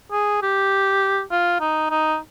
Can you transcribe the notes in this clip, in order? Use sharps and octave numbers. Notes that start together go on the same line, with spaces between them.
G#4
G4
F4
D#4
D#4